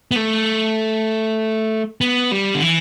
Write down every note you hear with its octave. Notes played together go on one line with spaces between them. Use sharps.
B3
A3
B3
G3
D3
E3